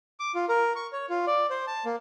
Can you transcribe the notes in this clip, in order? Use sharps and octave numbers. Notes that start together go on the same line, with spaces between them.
D6
F4
A#4
C#6
C#5
F4
D5
C5
A5
A#3